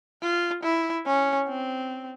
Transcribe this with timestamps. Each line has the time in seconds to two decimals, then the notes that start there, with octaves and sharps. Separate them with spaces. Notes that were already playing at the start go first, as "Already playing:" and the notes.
0.22 F4
0.63 E4
1.06 C#4
1.48 C4